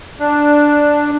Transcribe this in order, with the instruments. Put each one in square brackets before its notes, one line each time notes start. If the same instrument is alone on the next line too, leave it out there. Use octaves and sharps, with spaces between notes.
[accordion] D4